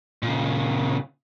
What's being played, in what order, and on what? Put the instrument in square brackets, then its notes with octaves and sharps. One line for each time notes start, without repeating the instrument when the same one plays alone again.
[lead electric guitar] A#2 C#3